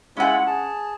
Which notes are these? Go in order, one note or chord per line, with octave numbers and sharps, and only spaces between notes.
G#3 C#4 E4 F4 F#5
G#4 A5